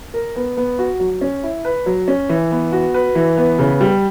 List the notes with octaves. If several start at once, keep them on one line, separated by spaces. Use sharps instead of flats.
A#4
B3
B3
F#4
F#3
C#4
E4
B4
F#3
C#4
E3
B3
F#4
B4
E3
B3
C#3
G3